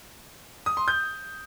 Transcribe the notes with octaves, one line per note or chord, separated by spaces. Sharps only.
D#6
C6
G6